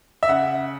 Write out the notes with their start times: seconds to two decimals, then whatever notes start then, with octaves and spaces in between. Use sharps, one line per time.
0.23 E5
0.29 C#3 F#5